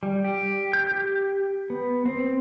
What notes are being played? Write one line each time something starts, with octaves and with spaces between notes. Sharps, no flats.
G3
G4
G6
G4
B3
C4